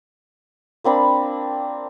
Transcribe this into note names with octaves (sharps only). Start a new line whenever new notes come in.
A#3 C4 D4 B5